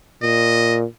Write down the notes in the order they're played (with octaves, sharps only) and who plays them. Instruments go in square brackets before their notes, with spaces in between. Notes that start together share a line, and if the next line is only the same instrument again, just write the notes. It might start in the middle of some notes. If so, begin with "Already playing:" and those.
[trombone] A#2 [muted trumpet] D#5